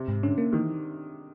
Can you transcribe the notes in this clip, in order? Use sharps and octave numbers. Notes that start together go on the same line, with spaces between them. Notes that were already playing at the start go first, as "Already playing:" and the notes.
Already playing: C3
G#2
D3 C#4
A#3
D#3 E3